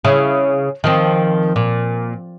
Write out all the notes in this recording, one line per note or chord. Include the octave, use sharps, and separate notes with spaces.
C#3 E4
D#3 F3 C4
A#2